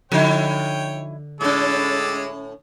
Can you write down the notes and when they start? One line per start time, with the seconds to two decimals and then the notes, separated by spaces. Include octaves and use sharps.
0.12 D3 F3 D#4 E4 C#5 G5
1.41 A2 G#3 C#4 A4 D6